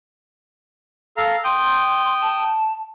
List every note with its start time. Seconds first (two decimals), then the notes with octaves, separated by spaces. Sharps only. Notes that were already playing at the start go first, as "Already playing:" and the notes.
1.17 A4 F5 A#5
1.44 G5 C6 D#6 G6
2.21 A5